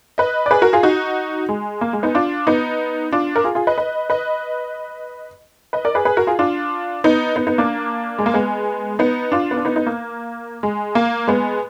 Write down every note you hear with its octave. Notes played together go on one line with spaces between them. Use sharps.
B4 D#5
D5
G#4 B4
F#4 A#4
F4 G#4
D#4 F#4
G#3
A#3
G#3
B3 D#4
D4 F4
B3 D#4
D4 F4
A#4
F4 G#4
F4 G#4
B4 D#5
B4 D#5
B4 D#5
B4 D#5
A#4 D5
G#4 B4
G#4 B4
F#4 A#4
F4 G#4
D4 F4
B3 D#4
B3 D#4
B3 D#4
A#3 D4
G#3
A#3
G#3 B3
B3 D#4
D4 F4
B3
D4
B3 D#4
B3 D#4
A#3
G#3
A#3
G#3 B3